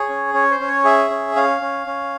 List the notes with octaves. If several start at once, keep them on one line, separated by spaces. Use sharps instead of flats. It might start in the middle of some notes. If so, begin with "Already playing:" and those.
Already playing: G#4 C#5
C#4
C#4 C#5
C5
C#4
C#5
G#4 E5
C#4
C#4 F5
C#4
C#4